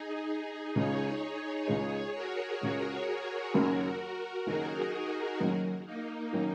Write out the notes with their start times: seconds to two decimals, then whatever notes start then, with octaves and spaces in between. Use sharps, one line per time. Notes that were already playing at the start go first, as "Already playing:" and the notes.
Already playing: D#4 G#4
0.75 C#2 C#3 G#3 G#4 C#5
1.22 G#4 C#5
1.68 C#2 C#3 G#3 G#4 C#5
2.15 F#4 A#4
2.61 C#2 C#3 G#3
3.54 F#1 F#2 D#3 F#3 C#4
4.46 F#1 F#2 D#3 F#3 C#4 D#4 G#4
5.40 F#1 F#2 D#3 F#3 C#4
5.86 A#3 D#4
6.33 D#3 F#3 C#4